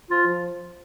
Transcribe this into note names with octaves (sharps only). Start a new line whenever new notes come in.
F3 F4
F3